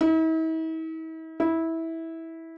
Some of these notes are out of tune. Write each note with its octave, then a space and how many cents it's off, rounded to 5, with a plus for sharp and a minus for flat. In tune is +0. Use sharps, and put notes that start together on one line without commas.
E4 -45
E4 -15